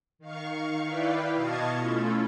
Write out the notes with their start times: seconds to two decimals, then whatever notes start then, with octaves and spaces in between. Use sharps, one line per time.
0.19 D#3 F5 C#6
0.84 E4 B4 D5 F5 G5
1.35 B2 D#5 F5 A5 C#6 G#6
1.77 A3 C#4 E4 F4 A4